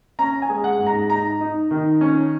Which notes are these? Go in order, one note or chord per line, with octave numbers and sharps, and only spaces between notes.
C#4 A#5
G#5
G#3
F#5
G#2
A#5
D#4 A#5
D#4
D#3
C#4